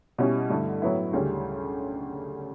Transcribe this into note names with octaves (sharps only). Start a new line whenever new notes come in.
B2 G3 C#4 E4 G4
G2 D3 A3 E4 A4
A2 F#3 B3 E4
D2 C#3 G3 C#4